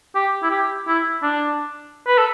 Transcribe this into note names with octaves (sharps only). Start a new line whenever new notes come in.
G4
E4
G4
E4
D4
B4
A4